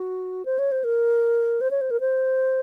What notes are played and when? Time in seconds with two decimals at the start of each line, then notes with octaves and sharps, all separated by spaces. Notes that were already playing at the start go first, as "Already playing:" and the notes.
Already playing: F#4
0.45 C5
0.58 C#5
0.71 C5
0.84 A#4
1.61 C5
1.71 C#5
1.81 C5
1.91 A#4
2.00 C5